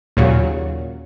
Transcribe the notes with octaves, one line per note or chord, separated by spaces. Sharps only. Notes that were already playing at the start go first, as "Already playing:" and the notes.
D#2 A#2 C#3 F#3